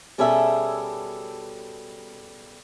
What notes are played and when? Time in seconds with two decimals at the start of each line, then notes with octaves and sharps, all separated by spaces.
0.18 B2 G3 C#4 G#4 A4 E5